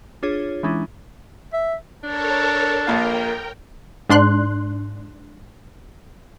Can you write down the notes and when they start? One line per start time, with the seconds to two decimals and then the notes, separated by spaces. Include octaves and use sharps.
0.23 D4 F4 G#4 C#5
0.63 E3 G#3 C#4 D4 E4
1.53 E5
2.03 D4 A4 A#4 C#5 A5
2.87 A#1 A#2 A#4 F5 G5
4.09 G#2 D4 C6 F#6